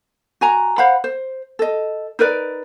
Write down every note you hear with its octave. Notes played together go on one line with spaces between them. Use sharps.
F#4 G#5 A#5
C5 F5 F#5 B5
C5
A4 D#5
D#4 A#4 B4 D5